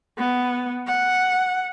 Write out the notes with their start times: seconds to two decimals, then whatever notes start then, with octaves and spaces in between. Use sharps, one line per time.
0.18 B3
0.87 F#5